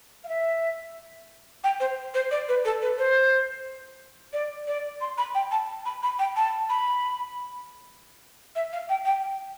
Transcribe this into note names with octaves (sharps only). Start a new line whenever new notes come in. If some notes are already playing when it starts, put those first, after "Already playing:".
F5
E5
G5
C5
C5
D5
B4
A4
B4
C5
D5
D5
C6
B5
G5
A5
B5
B5
G5
A5
B5
E5
F5
G5
G5